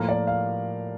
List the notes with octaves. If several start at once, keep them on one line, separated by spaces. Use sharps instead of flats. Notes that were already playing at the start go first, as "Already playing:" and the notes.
Already playing: A2 F3 A#3 A#4
D5
F5